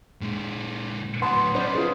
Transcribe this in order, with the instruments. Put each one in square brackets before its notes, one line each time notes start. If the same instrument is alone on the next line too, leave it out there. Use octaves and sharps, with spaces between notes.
[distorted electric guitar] A#2 G#3
[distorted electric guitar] A2 F#3 [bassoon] B3 [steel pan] A5 [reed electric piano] C6
[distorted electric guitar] C#4 D#4 [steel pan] B4 C5 D5
[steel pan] F4 G#4